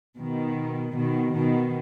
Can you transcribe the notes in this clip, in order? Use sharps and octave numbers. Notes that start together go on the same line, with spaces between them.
B2 D#3
B2 D#3
B2 D#3